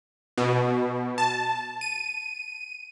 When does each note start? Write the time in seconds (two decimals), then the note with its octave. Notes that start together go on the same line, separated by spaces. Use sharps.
0.38 B2
1.18 A5
1.81 D#7